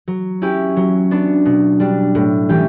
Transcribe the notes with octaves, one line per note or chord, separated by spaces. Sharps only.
F#3
C#4 E4 G4
F#3
B3 D4
B2
G3 D4
A2
E3 G3 C#4 G4